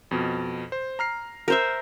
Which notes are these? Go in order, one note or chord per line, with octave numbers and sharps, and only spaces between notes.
F2 B2
C5
A#5 F6 C7
A#4 C5 E5